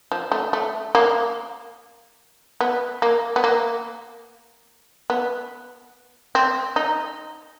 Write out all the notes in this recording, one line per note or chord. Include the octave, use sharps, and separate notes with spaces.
F3
A3
A3
A#3
B3
A#3
B3
A#3
B3
C4
D#4